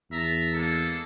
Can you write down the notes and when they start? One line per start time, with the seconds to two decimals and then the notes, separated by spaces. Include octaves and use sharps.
0.11 E2 E5 A5 A#5
0.54 G#3 A#3 A4